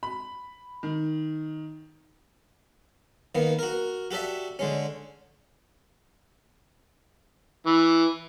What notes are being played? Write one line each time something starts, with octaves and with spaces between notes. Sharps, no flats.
B5
D#3
D#3 A#3 B3
F#4 A#4
F#4 G4 A4 D5 E5
D3 G#3 C#4
E3